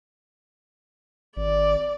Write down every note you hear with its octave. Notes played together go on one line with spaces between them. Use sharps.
G#1 D5